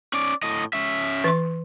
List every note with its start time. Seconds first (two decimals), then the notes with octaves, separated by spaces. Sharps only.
0.14 C#4 D5
0.43 A2 D#5
0.73 C#4 E5
1.24 E3 C6